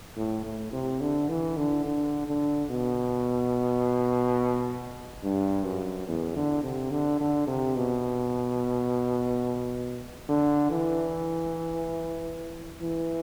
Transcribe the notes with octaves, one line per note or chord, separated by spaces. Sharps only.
A2
A2
C3
D3
E3
D3
D3
D3
B2
G2
F#2
E2
D3
C3
D3
D3
C3
B2
D3
E3
E3